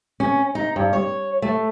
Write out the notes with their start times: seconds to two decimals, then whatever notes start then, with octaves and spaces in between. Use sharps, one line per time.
0.20 C#4
0.55 D#4
0.76 G2
0.93 C#5
1.42 A3